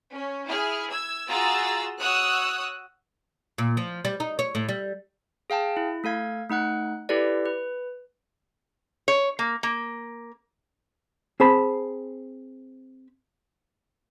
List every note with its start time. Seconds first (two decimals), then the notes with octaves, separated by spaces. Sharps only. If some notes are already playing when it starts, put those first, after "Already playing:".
0.12 C#4
0.49 E4 G#4 F6
0.89 E6 G#6
1.29 F4 F#4 G#4 A#5 E6 A6
2.00 F#4 C#5 D#6 E6 F#6
3.58 A#2
3.77 F3
4.05 G3
4.20 D#4
4.39 C#5
4.55 A2
4.69 G3
5.50 G#4 F5 G5 A5
5.77 E4
6.04 A3 A4 F5 G#6
6.49 A3 D#4 F#5 F#6
7.09 E4 G4 A4 B4 D5
7.45 B4
9.08 C#5
9.39 A#3
9.63 A#3
11.40 C4 G#4 C5 A5 B5